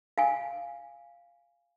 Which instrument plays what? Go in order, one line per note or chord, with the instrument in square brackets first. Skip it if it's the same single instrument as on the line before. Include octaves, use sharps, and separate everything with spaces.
[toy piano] F5 G#5